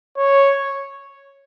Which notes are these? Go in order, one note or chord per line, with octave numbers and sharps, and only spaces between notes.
C#5